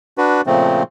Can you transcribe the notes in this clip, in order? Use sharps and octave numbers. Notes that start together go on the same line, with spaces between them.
D4 F#4 B4
A#2 C#3 F3 A3 C4